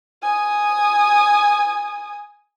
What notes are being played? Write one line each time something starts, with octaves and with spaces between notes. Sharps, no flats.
G#5 D#6